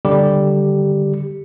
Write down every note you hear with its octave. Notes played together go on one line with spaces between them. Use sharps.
D3 G3 G4